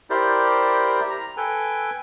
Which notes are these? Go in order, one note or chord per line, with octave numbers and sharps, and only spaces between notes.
E4 G4 A#4 C5 D5
A#5
A4 B4 G5 G#5